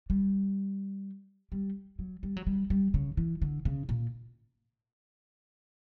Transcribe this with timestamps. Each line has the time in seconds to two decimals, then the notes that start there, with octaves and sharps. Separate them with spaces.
0.10 G3
1.52 G3
1.99 F#3
2.23 G3
2.37 F#3
2.47 G3
2.70 G3
2.94 C#3
3.17 E3
3.42 D3
3.65 C#3
3.89 A#2